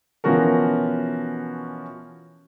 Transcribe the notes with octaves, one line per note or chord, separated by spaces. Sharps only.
B2 E3 F3 C#4 F#4 A#4